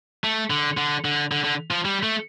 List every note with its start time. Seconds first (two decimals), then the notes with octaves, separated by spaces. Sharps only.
0.24 A3
0.50 D3
0.77 D3
1.05 D3
1.31 D3
1.44 D3
1.71 F3
1.85 G3
2.03 A3